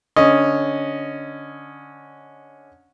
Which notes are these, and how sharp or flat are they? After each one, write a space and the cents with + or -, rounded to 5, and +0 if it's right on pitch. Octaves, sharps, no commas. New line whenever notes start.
D3 -10 C#4 +0 D#5 +0